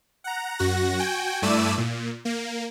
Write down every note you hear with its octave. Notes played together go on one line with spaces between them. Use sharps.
F#5 A#5
F#2 F#4 F#5 A#6
F#4 G5 G#5
G2 A3 E4 D5 E6 D#7
A#2
A#3